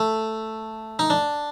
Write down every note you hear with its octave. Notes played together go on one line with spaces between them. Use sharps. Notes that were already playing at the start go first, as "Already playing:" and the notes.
Already playing: A3
D#4
D4